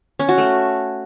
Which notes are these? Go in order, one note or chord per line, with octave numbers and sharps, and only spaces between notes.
C#4
F#4
A3